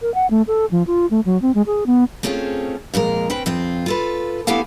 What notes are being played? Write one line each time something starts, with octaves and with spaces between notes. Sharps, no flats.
A#4
F#5
A3
A4
F3
F4
A3
F#3
C4
G#3
G#4
B3
A3 C4 C#4 F4 G4 G#4
F2 A#2 G#3 A#4
C4 C#4 B4 G5
F2 C4 F4
F4 A4 B4
B3 E4 G4 A4 F5 G#5